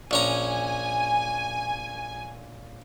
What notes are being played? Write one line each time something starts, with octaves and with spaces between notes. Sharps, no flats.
A#1 C#4 G#5 A#5